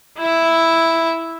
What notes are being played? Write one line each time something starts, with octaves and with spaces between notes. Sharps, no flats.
E4 E5